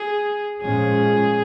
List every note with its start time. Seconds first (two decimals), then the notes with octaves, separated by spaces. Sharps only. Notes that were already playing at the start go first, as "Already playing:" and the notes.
Already playing: G#4
0.61 A#2 F3 G#3 C#4 G#4